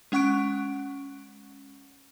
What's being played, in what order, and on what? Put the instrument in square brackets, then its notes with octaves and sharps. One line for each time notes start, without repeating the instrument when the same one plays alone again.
[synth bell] G#3 C#4 F#5 C#6 F#6 D7